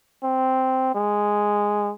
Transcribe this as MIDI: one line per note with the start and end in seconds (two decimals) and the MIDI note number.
0.23 0.94 60
0.95 1.92 56